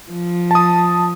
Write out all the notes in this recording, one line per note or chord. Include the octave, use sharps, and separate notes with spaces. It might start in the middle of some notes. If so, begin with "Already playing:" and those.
F3
A5 D#6